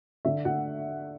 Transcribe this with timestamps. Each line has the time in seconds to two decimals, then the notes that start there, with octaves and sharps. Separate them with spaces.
0.25 D3 E5
0.45 D3 F#5